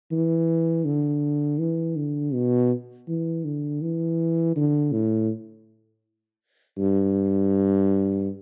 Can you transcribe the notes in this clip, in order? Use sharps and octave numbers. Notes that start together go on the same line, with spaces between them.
E3
D3
E3
D3
B2
E3
D3
E3
D3
A2
G2